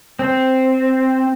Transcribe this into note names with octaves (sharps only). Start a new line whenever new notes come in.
C4